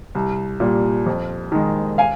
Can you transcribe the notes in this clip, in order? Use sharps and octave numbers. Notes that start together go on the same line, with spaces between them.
C2
A#2 G3
F2
D#3 G#3
F5 G#5